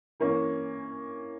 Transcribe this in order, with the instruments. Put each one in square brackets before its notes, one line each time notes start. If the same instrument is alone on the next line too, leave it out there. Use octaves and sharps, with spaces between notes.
[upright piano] E3 A#3 C#4